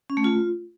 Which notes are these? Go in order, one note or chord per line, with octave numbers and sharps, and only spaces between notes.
C#4
A3
F4